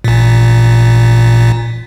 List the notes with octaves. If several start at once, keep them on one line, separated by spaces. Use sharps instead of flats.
A1 A#2